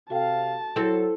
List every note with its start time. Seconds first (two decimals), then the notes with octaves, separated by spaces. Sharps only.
0.10 C3 F#4 A4 F5 G5 A5
0.76 F#3 C4 E4 A4